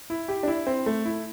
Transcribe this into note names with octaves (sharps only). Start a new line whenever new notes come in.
E4
G4
D4
E4
C4
A3
E4